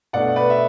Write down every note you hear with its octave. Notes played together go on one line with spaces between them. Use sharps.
B2 A3 D4 D5 F#5
B4 D5
E5